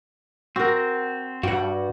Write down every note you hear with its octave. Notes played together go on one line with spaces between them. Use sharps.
C4 F#4 A#4
G2 F#4 F#5 G5